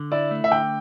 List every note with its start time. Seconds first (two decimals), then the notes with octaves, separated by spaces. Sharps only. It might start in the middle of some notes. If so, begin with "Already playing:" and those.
Already playing: D3
0.12 E4 D5
0.31 A3
0.44 E5
0.51 D3 G5